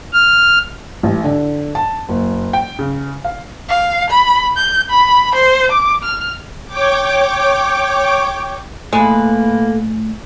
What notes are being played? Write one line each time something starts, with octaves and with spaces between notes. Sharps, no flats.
F6
A1
D3
A5
F#1
G5
C#3
F5
F5
B5
G6
B5
C5
D6
F6
C#5 G5 D6
A2 G#3 A#3 A4 B4